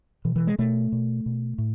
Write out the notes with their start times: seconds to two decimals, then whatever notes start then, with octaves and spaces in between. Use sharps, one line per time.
0.25 B2 E3
0.36 E3
0.47 G#3
0.59 B2 A3
0.92 B2
1.26 B2
1.58 A2